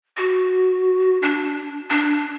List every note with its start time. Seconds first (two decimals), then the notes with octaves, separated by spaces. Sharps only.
0.17 F#4
1.22 D4
1.90 D4